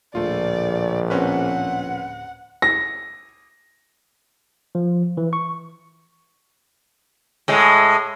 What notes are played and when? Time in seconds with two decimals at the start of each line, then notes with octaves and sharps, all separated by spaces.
0.15 D1 A#1 A3 F4 D5
1.10 C4 C#4 B4 F#5
2.62 A#6
4.75 F3
5.17 E3
5.33 C#6
7.48 A2 G#3